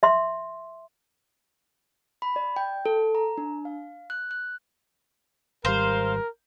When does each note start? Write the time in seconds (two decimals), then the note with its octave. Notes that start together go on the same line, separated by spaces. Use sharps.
0.03 E5 C6
2.22 B5
2.36 D5
2.56 G5
2.86 A4
3.15 A#5
3.38 D4
3.65 F5
4.10 F#6
4.31 F#6
5.65 G#1 G3 A#4 C5 F5